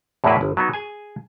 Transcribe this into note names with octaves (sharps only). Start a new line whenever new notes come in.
E2 A2 F#3 A#3 E4 B4
G1
F#3 B3 D#4
G#4 G#5